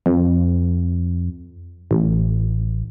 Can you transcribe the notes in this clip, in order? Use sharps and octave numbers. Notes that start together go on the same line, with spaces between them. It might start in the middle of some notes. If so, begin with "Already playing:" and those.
F2
A1